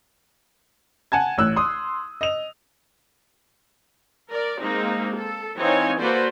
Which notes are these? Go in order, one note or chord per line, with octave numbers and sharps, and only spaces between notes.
F#5 G#5 A5 G#6
A1 E6 F#6
C6 D#6
D#5 F7
A#4 D5
G#3 A#3 C4 D#4
A4
E3 C4 D#4 C#5 F5 G#5
A#3 F#4 A4 B4 C5 D5